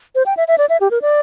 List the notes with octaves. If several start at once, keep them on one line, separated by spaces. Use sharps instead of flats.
C5
G5
E5
E5
D5
E5
G4
A#4
D5